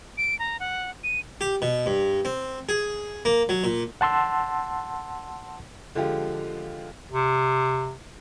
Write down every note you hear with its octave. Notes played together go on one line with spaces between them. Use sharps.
D7
A#5
F#5
D#7
G4
B2
G2
C4
G#4
A#3
F#3
A#2
F#5 A5 C6 E6
D3 F3 G#3 F4 G4
C3